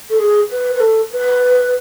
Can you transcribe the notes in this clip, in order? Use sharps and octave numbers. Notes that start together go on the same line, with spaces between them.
A4
G#4
B4
B4
A4
B4